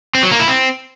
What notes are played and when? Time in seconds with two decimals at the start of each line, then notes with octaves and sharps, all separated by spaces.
0.15 C4
0.23 F#3
0.31 A#3
0.40 E4
0.48 C4